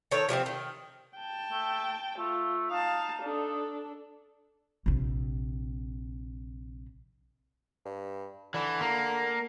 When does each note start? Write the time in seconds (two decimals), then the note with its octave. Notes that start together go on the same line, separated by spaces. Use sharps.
0.11 D#3 A4 C#5
0.29 C3 F3 A3 C4
0.46 D#3
1.17 G5 A5
1.52 A3
2.19 A3 F4
2.70 D#4 F5 A5
3.22 D4 A4
4.86 A#1 C3
7.86 G2
8.54 D3 E3
8.81 A#3